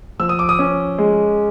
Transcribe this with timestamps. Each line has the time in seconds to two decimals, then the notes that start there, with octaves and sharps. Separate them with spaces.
0.20 F3 E6
0.29 D#6
0.39 D6
0.49 D#6
0.59 C#4
0.98 G#3